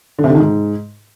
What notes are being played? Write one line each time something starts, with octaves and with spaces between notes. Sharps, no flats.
D3
C3
D3
D#3
G#2